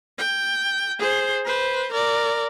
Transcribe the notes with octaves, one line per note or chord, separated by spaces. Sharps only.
G5
G#4 C5
B4 C5
A#4 D5